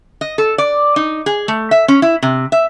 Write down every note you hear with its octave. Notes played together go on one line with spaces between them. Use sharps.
D#5
A4
D5
D#4
G#4
A3
E5
C#4
E4
C3
E5